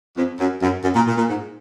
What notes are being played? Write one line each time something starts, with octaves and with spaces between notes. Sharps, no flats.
F2
F#2
F#2
F#2
A#2
A#2
A#2
G#2